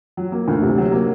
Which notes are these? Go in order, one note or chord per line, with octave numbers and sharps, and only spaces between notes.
F#3
A#3
D2
C3
F#3
A#3